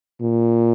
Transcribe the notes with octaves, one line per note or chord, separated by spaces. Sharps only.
A#2